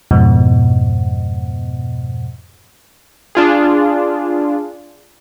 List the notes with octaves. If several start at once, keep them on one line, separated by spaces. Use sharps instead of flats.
F2 G#2 B2
D4 F4 G#4